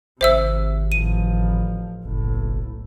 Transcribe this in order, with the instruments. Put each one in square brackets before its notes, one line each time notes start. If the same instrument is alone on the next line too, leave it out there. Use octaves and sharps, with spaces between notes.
[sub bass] G#1 [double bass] C3 [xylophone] C5 E5 E6
[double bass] A1 F3 [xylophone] D#7
[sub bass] F#1 [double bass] B1 A2